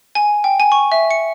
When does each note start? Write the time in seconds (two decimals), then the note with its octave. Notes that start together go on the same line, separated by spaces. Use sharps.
0.15 G#5
0.44 G5
0.60 G#5
0.72 C#6
0.92 E5
1.11 C#7